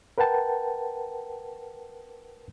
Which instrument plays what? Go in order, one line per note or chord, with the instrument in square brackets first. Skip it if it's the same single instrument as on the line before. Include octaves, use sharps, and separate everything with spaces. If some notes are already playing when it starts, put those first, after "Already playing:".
[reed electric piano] A#4 B4 F#5 G5 A5